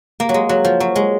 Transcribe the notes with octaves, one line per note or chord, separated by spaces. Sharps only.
A#3
F#3
G#3
F#3
F3
F#3
G#3